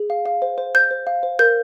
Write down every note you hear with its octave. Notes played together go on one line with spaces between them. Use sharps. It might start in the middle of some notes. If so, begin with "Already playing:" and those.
Already playing: G#4
F5
F5
C5
C5
C5 G6
C5
F5
C5
A#4 G6